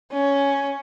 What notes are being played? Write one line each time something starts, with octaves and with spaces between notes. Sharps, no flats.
C#4